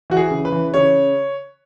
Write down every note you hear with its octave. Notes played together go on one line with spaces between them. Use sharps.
E3 F#4
G#4
C#3
B4
E3
C#3 C#5